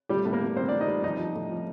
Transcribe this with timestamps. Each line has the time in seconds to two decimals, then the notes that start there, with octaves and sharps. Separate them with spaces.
0.09 A2 G3 G4
0.25 A2
0.33 A#3 A#4
0.41 A2
0.57 G3 C4 C5
0.68 D4 D5
0.73 G3
0.80 D#4 D#5
0.88 G3
1.04 F3 D#4 D#5
1.19 F3
1.36 A2
1.51 F3